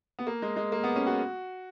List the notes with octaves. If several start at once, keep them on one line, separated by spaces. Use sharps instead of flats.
B3
A#3
G#3
G#3
A#3
B3
C#4
F#4